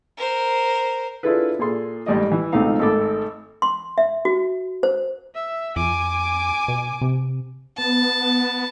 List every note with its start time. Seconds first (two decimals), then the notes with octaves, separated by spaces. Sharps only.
0.17 A#4 C5
1.23 D4 E4 F4 G#4 A4 B4
1.59 A#2 G#4 A4 C6
2.06 A1 G#2 G3 D5 D#5
2.32 E3
2.52 C#2 B2 A3 C4 D#4 F5
2.79 G#1 G#2 A3 A4 B5 D6
3.62 C6
3.98 E5
4.25 F#4
4.83 C5
5.35 E5
5.76 F2 G#5 D6
6.68 B2
7.01 C3
7.78 B3 A5